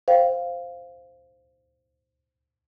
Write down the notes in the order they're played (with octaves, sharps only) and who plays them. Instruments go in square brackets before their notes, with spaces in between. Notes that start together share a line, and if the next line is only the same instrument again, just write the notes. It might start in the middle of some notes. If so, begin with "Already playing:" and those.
[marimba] C5 F5 G5